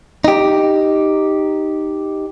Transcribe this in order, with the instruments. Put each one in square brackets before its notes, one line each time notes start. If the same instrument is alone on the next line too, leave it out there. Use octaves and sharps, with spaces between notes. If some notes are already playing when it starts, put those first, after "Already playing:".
[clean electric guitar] D#4 G4